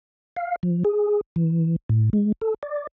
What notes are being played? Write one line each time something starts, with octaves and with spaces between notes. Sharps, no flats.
F5
F3
G#4
E3
A2
G#3
A4
D5